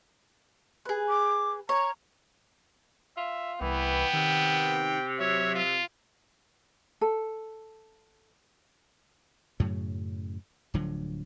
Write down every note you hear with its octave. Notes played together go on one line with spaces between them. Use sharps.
G#4 B4
D6
C#5 A#5
F4 E5
C2 E3 B3 G5
C3 D#3
F#3 C#5 E5
F4
A4
F#2 A2 C#3 F#3
D1 D3 F3 F#3